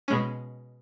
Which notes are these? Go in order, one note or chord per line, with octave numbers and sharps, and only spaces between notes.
B2 G#3 C#4